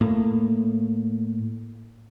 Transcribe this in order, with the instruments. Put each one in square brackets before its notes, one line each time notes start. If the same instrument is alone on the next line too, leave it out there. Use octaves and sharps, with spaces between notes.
[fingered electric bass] A2 A#3